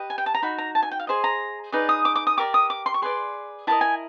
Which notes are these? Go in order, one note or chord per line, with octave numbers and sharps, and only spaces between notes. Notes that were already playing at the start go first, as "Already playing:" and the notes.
Already playing: G4 B4 D#5
G#5
G5
A5
A#5
D#4 F#4 B5
A#5
A5
G#5
G5
F5
G#4 C5 D#5
A#5
D#4 G#4 B4 D5
D#6
D6
D6
D#6
G4 A#4 D5 D6
D#6
D6
C6
C#6
G#4 B4 D5 C6
E4 G4 A#4 D#5 A5
G#5